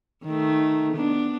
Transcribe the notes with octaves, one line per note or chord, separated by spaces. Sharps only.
D#3 A3
B3 D4